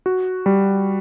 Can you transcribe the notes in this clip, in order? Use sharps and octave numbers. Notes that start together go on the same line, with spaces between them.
F#4
G3